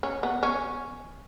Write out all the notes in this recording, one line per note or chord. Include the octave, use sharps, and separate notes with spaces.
C#4
B3
C#4